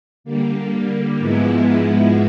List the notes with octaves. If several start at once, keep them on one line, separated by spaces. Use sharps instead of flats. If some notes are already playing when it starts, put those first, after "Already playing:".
D3 G3 A#3
G#2 F3 G#3 B3 E4